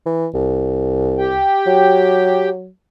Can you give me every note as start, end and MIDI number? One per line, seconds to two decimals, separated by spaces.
0.06 0.27 52
0.34 1.43 36
1.18 2.49 67
1.18 2.49 79
1.67 2.69 54